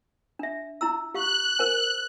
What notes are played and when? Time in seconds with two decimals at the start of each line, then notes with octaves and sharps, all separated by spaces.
0.39 D4 E5
0.81 E4 A#5 E6
1.14 G4 F5 C#6 F#6
1.59 A#4 C5 G#5